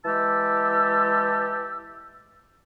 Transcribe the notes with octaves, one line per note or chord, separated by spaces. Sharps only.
E3 G#3 G4 A5 E6